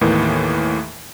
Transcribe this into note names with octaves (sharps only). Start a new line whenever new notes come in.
D#2 A2 D#3 E3 A#3 B3